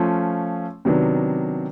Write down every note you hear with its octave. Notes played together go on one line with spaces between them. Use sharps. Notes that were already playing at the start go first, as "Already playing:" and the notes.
Already playing: F3 A3 C#4 F4
C3 D#3 F#3 B3 D4